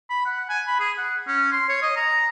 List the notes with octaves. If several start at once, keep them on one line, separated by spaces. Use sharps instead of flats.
B5
F#5
G#5
B5
G#4
F#5
C#4
C6
C#5
D#5
A#5